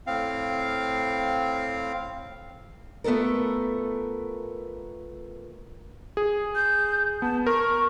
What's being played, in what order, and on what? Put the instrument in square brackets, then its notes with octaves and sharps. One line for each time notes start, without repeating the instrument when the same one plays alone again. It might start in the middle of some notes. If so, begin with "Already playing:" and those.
[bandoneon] A2 C4 F5
[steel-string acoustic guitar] A3 B3 F4 A4 A#4
[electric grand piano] G#4
[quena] G6
[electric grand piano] B3 [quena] A5
[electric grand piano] A#4 [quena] C#6